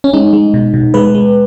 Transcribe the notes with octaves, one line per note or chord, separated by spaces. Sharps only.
C#4
G#3 D#4
G#3
B2
B2
G#3 B4
G#3